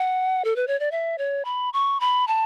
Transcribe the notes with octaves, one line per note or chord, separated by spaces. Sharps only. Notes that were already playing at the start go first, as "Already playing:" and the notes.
Already playing: F#5
A4
B4
C#5
D5
E5
C#5
B5
C#6
B5
A5